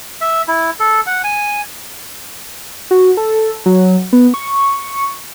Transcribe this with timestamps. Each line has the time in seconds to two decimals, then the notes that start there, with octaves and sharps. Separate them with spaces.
0.21 E5
0.48 E4
0.80 A4
1.07 F#5
1.24 G#5
2.91 F#4
3.17 A4
3.66 F#3
4.13 B3
4.34 C#6